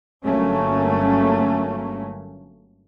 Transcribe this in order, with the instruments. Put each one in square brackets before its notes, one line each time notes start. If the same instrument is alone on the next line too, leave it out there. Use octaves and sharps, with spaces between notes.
[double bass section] G1 F#3 A3 A#3 C#4